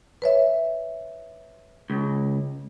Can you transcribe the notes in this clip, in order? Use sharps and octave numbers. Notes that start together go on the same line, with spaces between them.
B4 C#5 E5
C#2